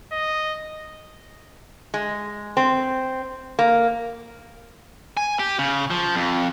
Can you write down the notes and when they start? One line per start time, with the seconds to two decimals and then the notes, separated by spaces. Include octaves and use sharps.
0.12 D#5
1.94 G#3
2.57 C4
3.59 A#3
5.17 G#5
5.39 G4
5.59 C#3
5.90 F3
6.15 F2